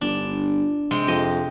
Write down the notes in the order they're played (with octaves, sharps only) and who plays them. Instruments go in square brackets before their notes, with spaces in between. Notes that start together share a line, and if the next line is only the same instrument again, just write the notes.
[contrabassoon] G1 [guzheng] D4
[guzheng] C3 G#3 G5
[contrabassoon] F2 [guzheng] G4 D#5